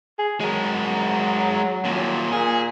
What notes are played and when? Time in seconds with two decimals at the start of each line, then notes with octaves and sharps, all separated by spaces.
0.18 G#4
0.40 F#3 G#3 A#4
1.84 D#2 A#2
2.32 A#2 G#4